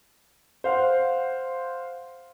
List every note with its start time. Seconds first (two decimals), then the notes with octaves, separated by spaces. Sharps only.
0.64 C5 F5 F#5